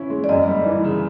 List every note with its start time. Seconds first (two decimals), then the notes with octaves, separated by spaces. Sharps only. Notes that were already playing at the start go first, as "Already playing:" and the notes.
Already playing: E3 C#4 E4
0.10 G#3
0.24 D5
0.29 F#2 D#5
0.48 G3
0.66 E3
0.84 C#3